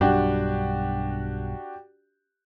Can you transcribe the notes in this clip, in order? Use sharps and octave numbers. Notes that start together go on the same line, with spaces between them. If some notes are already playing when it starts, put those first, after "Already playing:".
B1 G2 D4 F#4 G4